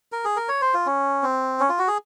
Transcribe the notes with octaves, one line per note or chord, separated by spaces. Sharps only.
A#4
G#4
A#4
C#5
C5
F4
C#4
C4
C#4
F4
F#4
G#4